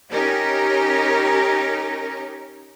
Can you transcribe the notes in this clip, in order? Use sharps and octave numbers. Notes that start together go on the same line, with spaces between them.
C#4 D#4 G4 A#4